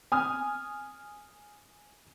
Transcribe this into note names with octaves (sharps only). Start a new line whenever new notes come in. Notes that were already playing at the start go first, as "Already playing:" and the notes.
G#5 D#6 F6